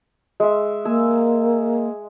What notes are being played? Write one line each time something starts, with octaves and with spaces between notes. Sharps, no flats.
G#3 E5
A#3 G#5 E6